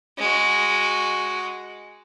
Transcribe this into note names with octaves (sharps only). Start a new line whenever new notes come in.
G#3 F#4